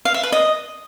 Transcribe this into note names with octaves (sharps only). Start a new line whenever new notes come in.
F5
E5
B4
D#5